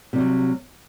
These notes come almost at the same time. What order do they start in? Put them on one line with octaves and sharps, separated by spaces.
C3 G3 F#3